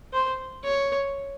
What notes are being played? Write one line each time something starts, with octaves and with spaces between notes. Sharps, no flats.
C5
C#5